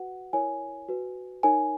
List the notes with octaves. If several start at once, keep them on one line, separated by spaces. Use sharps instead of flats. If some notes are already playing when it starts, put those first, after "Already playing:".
Already playing: F#4 B4 F#5
E4 A#4 C#5 G#5
F#4 B4
D#4 A#4 C#5 G#5